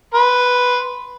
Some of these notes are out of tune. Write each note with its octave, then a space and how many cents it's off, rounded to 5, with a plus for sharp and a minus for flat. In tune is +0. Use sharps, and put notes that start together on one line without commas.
B4 +0 C6 -10